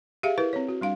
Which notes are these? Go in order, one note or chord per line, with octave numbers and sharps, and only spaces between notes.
G4 G#4 E5 F5
E4 A#4 B4
C4 C#5
F#4
G3 D4 F5